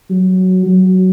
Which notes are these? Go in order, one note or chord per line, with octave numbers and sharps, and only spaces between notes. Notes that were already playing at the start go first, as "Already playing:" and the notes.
F#3
F#3